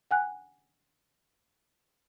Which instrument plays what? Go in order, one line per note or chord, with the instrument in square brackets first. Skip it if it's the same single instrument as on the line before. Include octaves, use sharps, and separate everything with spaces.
[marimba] F#5 G#5 F#6